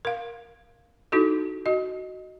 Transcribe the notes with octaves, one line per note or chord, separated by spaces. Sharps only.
A#4 F5
D#4 E4 F#4 A4
F#4 D#5